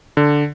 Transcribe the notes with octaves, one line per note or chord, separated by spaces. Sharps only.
D3